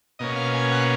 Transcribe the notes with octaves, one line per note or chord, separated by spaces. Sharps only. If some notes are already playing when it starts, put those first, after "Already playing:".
B2 A#3 C#4 D#5
F5
G#5
F#5